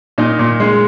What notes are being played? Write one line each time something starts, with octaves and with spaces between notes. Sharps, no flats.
A#2 D#4 D#5
A#2
G#3